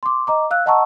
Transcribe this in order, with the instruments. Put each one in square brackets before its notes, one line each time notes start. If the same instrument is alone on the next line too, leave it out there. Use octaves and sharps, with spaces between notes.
[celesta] C6 D6
D#5 A#5 D6
F5 E6 F#6
D#5 F#5 A5 A#5 C#6 E6